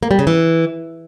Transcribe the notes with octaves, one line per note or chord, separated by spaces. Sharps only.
A#3
G3
C#3
E3